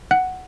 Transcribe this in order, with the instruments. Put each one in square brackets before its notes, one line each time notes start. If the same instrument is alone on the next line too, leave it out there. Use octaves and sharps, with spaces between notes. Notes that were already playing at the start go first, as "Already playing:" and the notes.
[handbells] F#5 F#6